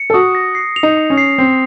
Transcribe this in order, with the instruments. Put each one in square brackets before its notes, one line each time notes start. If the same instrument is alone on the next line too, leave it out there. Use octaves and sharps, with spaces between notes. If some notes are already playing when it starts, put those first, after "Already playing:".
Already playing: [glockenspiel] C#7
[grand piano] A4
[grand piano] F#4 [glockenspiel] D#6
[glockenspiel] A#6
C7
F7
[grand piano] D#4
[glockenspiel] D#6
[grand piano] C#4
[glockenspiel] C7
[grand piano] C4 [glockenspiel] C7